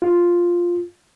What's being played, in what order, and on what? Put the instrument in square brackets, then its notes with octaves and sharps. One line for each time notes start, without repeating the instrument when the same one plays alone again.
[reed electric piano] F4